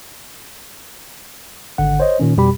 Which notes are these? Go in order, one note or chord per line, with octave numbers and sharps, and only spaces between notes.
G#1 D3 F#5
C5 C#5 D#5
A#2 D#3 C#4
F2 B2 G3 G4 B5